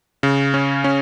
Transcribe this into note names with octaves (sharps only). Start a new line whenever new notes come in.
C#3
C#4
C#4